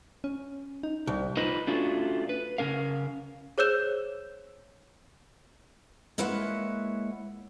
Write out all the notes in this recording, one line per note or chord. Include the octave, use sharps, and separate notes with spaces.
C#4
D#4
C2
D#4 F4 B4 C5 D#5
A3 C#4 D4 F4 F#4
B4
C#3 C#4 A#4 F5
G#4 C5 C#5 E6 G6 E7
G#3 A#3 E4 B4 C#5 F#5